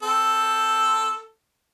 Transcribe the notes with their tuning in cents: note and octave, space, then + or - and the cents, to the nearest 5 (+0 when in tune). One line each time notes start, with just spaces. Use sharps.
C4 +0 A4 +0